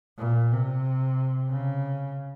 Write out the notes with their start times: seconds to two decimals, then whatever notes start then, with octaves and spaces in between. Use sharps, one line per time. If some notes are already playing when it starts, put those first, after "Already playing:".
0.18 A#2
0.51 C3
1.50 C#3